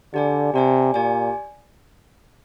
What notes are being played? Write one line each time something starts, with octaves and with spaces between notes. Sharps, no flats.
D3 G4 D5 G#5
C3 G4 D5 G#5
A#2 G4 D5 G#5